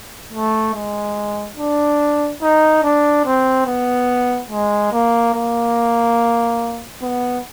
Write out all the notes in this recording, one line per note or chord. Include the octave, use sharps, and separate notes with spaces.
A3
G#3
D4
D#4
D4
C4
B3
G#3
A#3
A#3
B3